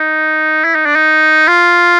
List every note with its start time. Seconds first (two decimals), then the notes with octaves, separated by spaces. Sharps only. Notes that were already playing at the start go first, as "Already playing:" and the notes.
Already playing: D#4
0.64 E4
0.75 D#4
0.86 D4
0.95 D#4
1.48 F4